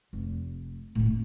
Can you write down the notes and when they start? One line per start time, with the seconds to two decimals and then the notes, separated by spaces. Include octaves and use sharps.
0.13 F1
0.95 A2 C#3
1.09 C3